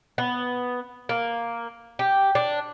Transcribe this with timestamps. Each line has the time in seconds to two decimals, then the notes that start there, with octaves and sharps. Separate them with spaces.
0.18 B3
1.09 A#3
1.99 G4
2.35 D4